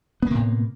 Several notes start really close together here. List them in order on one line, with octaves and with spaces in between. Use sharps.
B3 A#3 C3 A2